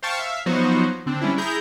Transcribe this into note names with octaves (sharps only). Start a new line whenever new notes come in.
C5 F5 G5 A5 C#6
E5 F5
F3 F#3 B3 D#4 F#4 C5
D3 C4 D4
G3 C#4 D4 E4
E4 G#4 A#5 G6 A#6